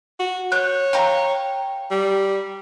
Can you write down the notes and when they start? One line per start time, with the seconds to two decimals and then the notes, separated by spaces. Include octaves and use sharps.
0.19 F#4
0.52 C#5 F#6 G6
0.93 F5 G5 A#5
1.91 G3